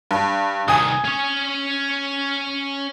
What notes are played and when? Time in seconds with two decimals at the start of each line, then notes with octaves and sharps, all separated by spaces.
0.11 G2
0.68 C2 D#3 G#5 D#6
1.05 C#4 C#5